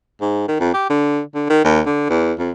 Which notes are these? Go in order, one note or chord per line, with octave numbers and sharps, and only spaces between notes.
G#2
D#3
F2
G4
D3
D3
D#3
D#2
D3
E2
F2